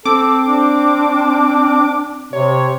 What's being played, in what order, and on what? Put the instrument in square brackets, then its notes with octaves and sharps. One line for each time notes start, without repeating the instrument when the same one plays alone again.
[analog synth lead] C4 [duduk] A4 [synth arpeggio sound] D6
[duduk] D4
[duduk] C3 [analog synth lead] C#5